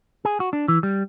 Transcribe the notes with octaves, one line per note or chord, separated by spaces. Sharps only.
G#4
F#4
D4
E3
G3